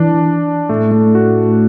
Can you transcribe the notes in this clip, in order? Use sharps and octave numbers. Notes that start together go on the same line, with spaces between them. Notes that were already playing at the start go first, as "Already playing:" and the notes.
Already playing: E3 D4
A2 A3
A3
F#4